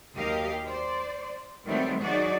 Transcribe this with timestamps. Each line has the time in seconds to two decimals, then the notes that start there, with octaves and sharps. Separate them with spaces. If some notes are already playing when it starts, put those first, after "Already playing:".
0.15 D#2 F#3 G4 A#4 D#5 F5
0.65 C5 D5
1.64 D#3 F#3 G3 A3 B3 C4
2.02 F#3 D#4 F#4 G#4 D5